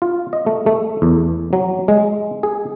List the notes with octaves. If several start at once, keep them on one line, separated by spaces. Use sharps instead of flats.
F4
D#5
A3
A3
E2
F#3
G#3
G#4